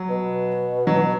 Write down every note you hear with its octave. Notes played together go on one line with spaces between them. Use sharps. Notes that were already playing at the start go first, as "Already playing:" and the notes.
Already playing: F#3
B2
F#3